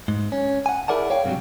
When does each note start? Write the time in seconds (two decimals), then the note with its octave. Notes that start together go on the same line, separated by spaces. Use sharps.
0.08 G#2
0.32 C#4
0.66 F#5 G#5
0.88 E4 G#4 A#4 D5 F#5 A5
1.10 C#5 F5 G5
1.25 G2 C3 E3 F#3 G3